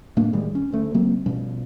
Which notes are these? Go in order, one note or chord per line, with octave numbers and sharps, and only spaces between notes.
A2 A3 A#3 D4
A2 D#3 G3 G#3
C#4
D2 A3
C#3 F#3 A#3 C4
B2 F3 G3 C#4